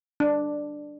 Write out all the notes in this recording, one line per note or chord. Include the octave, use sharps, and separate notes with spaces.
D4